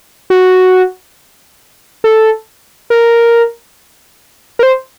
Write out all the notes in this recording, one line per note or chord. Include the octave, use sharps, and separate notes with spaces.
F#4
A4
A#4
A#4
C5